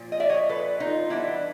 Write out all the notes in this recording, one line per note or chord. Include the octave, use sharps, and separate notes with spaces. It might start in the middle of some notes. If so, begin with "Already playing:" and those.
Already playing: A#2 F3
D#5
D5 E5
C#5 D#5
A4 B4
D#4 F4
E3 G3 B3 D4 E4